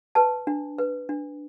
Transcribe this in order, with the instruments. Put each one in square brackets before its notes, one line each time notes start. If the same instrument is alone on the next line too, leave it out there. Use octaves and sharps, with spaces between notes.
[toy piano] B4 A5
D4
B4
D4